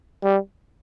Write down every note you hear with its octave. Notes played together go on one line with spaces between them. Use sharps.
G3